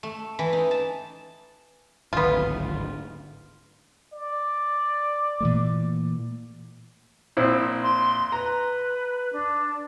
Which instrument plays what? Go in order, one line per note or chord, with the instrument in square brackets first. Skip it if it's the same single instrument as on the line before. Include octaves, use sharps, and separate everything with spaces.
[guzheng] A3
E3
D#4
A5
[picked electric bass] D1 G#1 D3 [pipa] B3 F4
[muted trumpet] D5
[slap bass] A#2 E3 A3
[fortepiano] A#1 C4 E4
[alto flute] C6
[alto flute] B4 [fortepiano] A#5
[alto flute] D4